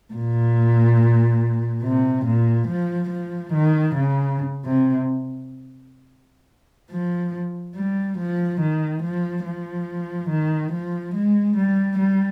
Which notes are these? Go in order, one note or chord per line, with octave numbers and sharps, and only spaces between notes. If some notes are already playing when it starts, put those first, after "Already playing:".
A#2
C3
A#2
F3
F3
D#3
C#3
C3
F3
G3
F3
D#3
F3
F3
D#3
F3
G#3
G3
G3